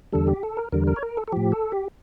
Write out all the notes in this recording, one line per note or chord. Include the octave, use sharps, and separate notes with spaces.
E2 D3 G3 A4
G4
A4
A#4
E2 D3 G3 A#4
A#4
C#5
A#4
A4
A4
A2 F3 G4
A4
G4